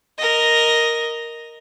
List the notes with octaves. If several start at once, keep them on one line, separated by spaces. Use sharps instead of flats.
A#4 D#5